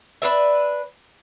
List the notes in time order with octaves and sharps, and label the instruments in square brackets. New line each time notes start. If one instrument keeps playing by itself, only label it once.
[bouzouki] D4 B4 E5